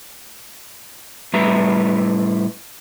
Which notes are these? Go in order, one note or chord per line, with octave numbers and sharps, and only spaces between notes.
A2 G3 B4 E5 A#5